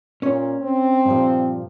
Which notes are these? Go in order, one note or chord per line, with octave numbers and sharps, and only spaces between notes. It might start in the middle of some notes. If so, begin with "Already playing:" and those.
A#2 C#4 C#5
C4
G2 A#2 F3